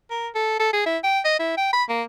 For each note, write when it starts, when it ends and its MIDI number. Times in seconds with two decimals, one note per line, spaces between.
0.10 0.28 70
0.35 0.58 69
0.60 0.72 69
0.73 0.83 68
0.86 0.98 64
1.03 1.20 79
1.25 1.39 75
1.39 1.55 64
1.57 1.69 79
1.73 1.84 83
1.89 2.03 58